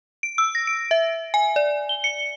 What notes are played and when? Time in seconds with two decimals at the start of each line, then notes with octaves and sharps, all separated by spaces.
0.23 D7
0.38 E6
0.55 A#6
0.67 D7
0.91 E5
1.34 G#5
1.56 D5
1.89 G7
2.04 C#7